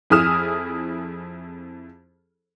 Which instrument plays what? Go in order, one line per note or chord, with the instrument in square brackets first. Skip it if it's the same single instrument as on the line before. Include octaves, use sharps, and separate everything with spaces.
[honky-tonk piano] F2 E4 G#4 D#6 F6 E7